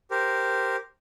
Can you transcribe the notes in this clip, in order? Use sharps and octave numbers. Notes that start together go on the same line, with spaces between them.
G4 A#4 C5